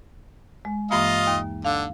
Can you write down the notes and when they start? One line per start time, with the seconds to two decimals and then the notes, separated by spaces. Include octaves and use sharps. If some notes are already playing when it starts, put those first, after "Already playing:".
0.65 G#3
0.91 G2 E3 A#3 F4 D#5 F5
1.27 D#2
1.65 D3 F5